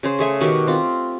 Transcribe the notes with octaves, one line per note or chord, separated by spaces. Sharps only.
C#3 G#4 C5
A3 G#4 E5 C#6
B2 D#3 G4 C#6
C4 F4